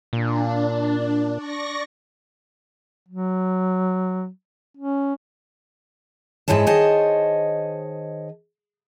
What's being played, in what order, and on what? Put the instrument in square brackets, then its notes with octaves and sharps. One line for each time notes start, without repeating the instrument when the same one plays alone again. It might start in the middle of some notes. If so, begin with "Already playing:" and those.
[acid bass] A#2 [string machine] D4
[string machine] D5 C#6 A#6
[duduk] F#3
C#4
[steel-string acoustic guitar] G#2 G#3 E4 C#5 A5
D#3 G#4 C5 C#5 D#5 A5